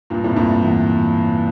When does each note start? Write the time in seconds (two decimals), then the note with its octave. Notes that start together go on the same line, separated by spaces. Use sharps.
0.10 G2 A#2
0.24 A2 C3
0.36 G2 A#2
0.63 E2